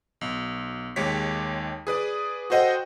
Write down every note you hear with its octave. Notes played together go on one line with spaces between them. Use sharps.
B1
D#2 G#3 G4 C#5 B6
G#4 B4 D5
F#4 A4 C5 D#5 F#5 G5